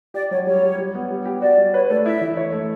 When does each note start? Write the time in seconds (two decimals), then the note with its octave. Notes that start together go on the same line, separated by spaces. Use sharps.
0.14 G4 D5
0.31 F#3 C#5
0.47 G3 C#5
0.63 G3
0.78 G3
0.95 B3
1.11 G3
1.26 G4
1.42 F#4 D5
1.57 G3
1.74 B4 C#5
1.90 A3 D5
2.05 E4 E5
2.21 E3
2.37 C#5
2.52 A3